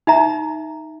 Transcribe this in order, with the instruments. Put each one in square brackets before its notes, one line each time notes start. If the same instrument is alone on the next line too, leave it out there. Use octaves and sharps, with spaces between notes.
[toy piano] D#4 E5 A#5